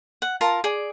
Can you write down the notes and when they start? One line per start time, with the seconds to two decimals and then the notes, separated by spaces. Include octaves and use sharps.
0.22 F#5
0.41 F4 A#4 A5 A#5
0.64 G#4 D5